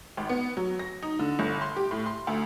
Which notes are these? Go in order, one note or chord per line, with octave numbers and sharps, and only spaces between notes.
G#1
B3
F#3
A#6
D#4
D3
G1
C6
G4
A2
C6
D2